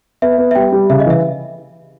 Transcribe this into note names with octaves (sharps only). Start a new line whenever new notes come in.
B3 E5
B3
E5
G3 G5
G3
C#3 E5
D#5
E3 E5